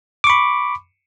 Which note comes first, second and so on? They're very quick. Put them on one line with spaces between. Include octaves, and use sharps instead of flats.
D6 C#6 B5